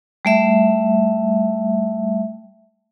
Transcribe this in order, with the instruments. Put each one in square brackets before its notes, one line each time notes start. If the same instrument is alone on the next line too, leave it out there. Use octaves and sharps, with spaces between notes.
[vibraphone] G3 A3 E5